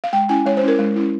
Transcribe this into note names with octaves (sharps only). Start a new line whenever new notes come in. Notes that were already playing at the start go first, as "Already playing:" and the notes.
F5
G#3 G5
C#4 E4 G#5
G#3 C#5
C5
C#4 E4 A#4
G#3
C#4 E4